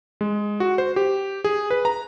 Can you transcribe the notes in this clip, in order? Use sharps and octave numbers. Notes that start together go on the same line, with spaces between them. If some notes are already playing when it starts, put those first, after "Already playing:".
G#3
F#4
C5
G4
G#4
B4
A#5